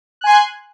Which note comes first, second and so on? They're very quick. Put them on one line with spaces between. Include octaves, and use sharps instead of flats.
F#6 G#5 C6